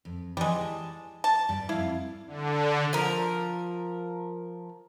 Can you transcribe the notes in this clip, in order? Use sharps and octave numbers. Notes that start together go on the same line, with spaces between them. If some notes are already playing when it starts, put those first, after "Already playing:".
F2
E3 F3 G3 G#3
A5
A5
G2 G3
F2 E4 F5
D3
F3 A#4